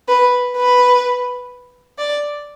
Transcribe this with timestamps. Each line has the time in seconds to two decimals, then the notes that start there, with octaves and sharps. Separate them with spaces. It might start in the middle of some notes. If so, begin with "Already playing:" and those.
0.09 B4
0.57 B4
1.99 D5